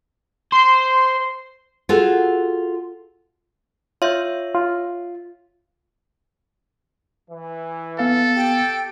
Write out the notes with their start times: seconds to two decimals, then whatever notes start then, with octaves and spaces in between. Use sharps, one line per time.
0.52 C5 C6 C7
1.89 F4 F#4 G#4 A4
4.02 F4 C#5 E5 G6
4.55 F4
7.30 E3
7.99 B3 A4 F5
8.36 G4 G5